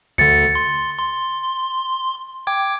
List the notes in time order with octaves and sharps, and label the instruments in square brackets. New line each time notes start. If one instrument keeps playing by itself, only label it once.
[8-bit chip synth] D2 D3 [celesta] A6 C#7
[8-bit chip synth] C6
C6
G5 D6 G#6